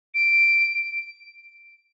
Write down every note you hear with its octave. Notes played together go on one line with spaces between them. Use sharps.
D7